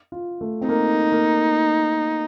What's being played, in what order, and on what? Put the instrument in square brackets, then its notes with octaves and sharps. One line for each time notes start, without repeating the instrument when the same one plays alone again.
[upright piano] F4
A3
C4
[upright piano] A#3 [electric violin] D#4
[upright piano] A#3